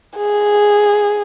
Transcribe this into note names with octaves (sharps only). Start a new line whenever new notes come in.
G#4